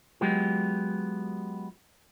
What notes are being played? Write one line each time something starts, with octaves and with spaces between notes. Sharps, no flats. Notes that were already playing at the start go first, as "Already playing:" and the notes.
F#3 G#3 B3 F4 G4